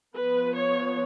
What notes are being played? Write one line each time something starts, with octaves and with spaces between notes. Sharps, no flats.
F3 B3 B4
C#5